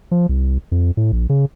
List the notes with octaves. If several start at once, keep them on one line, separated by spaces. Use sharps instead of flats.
F3
C2
F2
A2
A#1
C#3